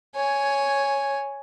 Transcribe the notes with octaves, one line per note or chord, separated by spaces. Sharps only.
C#5 G#5